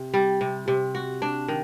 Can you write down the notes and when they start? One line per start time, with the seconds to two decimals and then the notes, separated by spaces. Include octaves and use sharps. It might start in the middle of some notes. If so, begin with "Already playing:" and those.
Already playing: C3
0.14 G3
0.41 C3
0.68 C3
0.95 F#4
1.22 D4
1.48 D#3